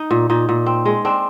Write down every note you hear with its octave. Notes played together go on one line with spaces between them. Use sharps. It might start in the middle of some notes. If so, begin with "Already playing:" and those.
Already playing: D#4
A#2
A#2 D#4
A#2
C4
G#3
C4 D4